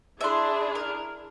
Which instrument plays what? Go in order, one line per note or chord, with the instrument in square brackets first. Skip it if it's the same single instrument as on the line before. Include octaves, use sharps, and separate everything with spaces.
[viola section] D4 E4 G#4 [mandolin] E5 C6
[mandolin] A#4